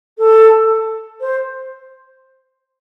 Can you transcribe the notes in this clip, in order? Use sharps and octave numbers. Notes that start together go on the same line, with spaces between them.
A4
C5